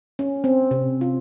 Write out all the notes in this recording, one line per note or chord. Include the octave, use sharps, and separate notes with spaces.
C#4
C4
C3
F4